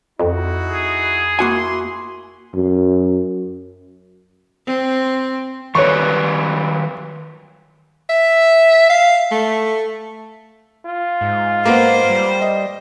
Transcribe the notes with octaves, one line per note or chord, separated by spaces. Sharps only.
F2 D#4 E4 F#4
G#4
A#3 E4 F#4 G#5 C6
F#2
C4
D#3 G3 B4 C#5 C#6
E5
F5
A3
F4
G#2
A#3 B3 C5
G3
D#5